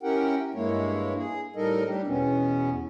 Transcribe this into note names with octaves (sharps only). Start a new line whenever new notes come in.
C#4 E4 G4 A#4 F#5 G5
G2 G#3 A#3 E4 C#5
G#4
A2 G3 D#4 A4 A#4 D#5
G3 D4 G4
E2 B2 B3 C#4